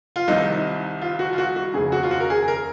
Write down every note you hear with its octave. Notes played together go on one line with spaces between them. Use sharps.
F4
C2 C3 D#3 D#4
F4
F#4
F4
F#4
F#4
F1 D#2 C#3 G#4
F#4
F4
F#4
A#4
G#4
A#4